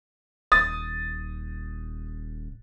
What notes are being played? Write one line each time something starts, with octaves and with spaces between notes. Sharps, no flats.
D#1 D#6 A6